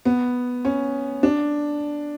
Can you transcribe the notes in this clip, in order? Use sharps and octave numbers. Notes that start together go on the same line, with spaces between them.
B3
C#4
D4